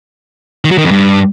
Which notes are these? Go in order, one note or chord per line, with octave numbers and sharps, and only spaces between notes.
D#3
F#3
D#3
F2
G2